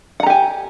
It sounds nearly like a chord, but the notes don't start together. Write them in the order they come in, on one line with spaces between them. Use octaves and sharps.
F#5 A#5 G4 G#5